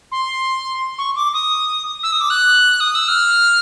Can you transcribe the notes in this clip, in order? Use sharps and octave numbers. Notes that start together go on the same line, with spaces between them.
C6
C#6
D6
D#6
E6
D#6
D6
F#6
D#6
E6
F6